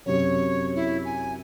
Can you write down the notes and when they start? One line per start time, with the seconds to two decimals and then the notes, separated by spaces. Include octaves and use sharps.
0.06 F#2 C3 F#3 C#5
0.75 E4
1.05 G#5